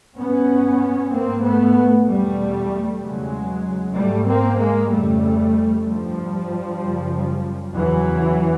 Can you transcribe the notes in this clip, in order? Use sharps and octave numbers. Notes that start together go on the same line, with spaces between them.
G2 B3 C#4
G#2 A#3 C4
A3 B3
E2 B2 G3 A3
E2 C#3 F#3 G#3
G#2 G3 A3
A#3 C4
G#3 A#3
F2 C#3 G3 A3
G2 F3 G3
F#2 C#3
E2 C#3 E3 F#3